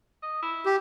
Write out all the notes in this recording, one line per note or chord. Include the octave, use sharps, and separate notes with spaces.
D#5
E4
G4